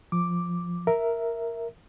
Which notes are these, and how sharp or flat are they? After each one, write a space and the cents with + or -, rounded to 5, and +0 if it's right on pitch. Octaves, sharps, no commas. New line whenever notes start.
F3 +0 D6 +0
A#4 +0 E5 +0